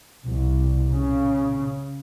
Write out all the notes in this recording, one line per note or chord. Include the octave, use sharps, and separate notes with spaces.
C2
C#3